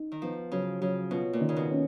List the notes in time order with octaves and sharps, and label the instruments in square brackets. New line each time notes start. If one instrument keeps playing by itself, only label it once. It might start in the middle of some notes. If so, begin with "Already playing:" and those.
Already playing: [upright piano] D#4
[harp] D#3
[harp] F3 [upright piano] B3
[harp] C#3 [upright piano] F#3
[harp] C#3 [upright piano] F#3
[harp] B2 [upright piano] F4
[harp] A#2
[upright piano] D#3
[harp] C#3
B2
[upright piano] C#4